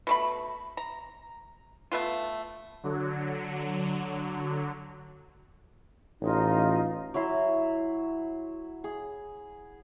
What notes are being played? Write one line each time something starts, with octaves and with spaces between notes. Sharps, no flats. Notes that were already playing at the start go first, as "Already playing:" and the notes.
B2 A3 B5
A#5
A3 B3 F4
D3 F#3
A1 D#4 F4
F#3 E4 E5 C6
G#4